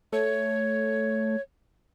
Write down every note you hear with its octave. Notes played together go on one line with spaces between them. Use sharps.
A3 C#5